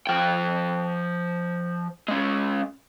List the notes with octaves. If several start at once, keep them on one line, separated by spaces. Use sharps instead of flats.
F3 G5
G#3 C#4